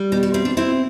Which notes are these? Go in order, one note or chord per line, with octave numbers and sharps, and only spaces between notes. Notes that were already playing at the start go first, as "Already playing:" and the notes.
Already playing: G3
B2 G4
F#4
C4 E4
D4
C4 E4